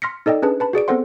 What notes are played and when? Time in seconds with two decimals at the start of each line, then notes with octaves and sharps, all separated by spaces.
0.02 C6 F6 A#6 B6 C#7
0.26 D#4 A4 D5 D#5 G5
0.42 C#4 D4 G#4 B4 A5
0.60 B4 A5 B5
0.73 F#4 G#4 D5 D7
0.88 B3 C4 A4 C5 F#5 C6